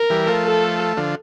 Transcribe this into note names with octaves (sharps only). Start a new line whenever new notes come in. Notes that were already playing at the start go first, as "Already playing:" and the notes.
Already playing: A#4
E3 G3
F3 A3
A4
D3 F3